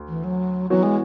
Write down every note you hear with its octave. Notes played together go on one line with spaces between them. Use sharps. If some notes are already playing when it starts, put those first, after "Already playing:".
Already playing: D2
E3
F#3
E3 F#3 B3 F#4 C#5
G#3